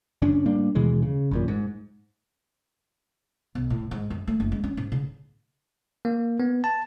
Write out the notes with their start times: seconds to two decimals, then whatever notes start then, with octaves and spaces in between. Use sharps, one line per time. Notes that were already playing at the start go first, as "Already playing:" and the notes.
0.22 F#1 F#2 C#4 D4
0.46 A2 G3 A#3 D4
0.75 D#2 B2 E3 G#3
1.02 C#3
1.31 G#1 F#2 A#2
1.48 G#2
3.55 B1
3.70 A2
3.91 G#2
4.10 F#2
4.27 A3
4.40 F#1
4.52 G#3
4.64 C#4
4.77 G#2
4.92 C#3
6.05 A#3
6.40 B3
6.64 A5